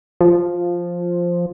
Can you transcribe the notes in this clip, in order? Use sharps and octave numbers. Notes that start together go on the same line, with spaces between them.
F3